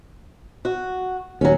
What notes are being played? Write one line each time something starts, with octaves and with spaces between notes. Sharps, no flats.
F#4
D#1 D#2 F#3 C#4